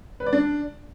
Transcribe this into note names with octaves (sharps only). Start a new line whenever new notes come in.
B4
D5
D4